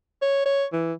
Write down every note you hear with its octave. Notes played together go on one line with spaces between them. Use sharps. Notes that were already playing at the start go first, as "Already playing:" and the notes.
C#5
C#5
E3